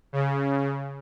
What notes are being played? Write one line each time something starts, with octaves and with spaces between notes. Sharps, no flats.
C#3